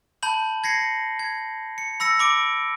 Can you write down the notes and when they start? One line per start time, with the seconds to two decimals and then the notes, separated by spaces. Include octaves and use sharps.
0.23 A5 B5 G6 F#7
0.64 G#6 A#6 C7 C#7
1.19 G#6
1.78 C#7
2.00 B5 E6 A#6 C#7
2.19 B5 D6 D7